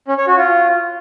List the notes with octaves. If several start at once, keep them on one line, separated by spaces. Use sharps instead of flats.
C#4
C#5
F#4
F4